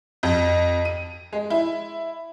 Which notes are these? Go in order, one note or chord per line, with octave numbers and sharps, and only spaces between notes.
F2
D#7
G#3
E4